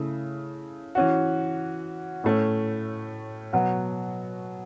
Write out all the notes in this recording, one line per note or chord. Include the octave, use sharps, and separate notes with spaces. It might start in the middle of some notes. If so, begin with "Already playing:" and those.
Already playing: C#3 A3 E4
E3 C#4 F#4
A2 A3 C#4
B2 F#3 B3 F#4